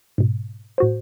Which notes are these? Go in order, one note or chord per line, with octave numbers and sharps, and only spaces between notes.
G#2 B2
A2 F#4 C5